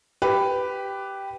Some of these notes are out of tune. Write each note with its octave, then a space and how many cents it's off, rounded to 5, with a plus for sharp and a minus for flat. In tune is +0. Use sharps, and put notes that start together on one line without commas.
G4 +0 B4 +10